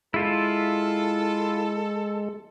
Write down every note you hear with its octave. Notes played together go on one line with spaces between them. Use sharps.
G#3 E4 F4 A4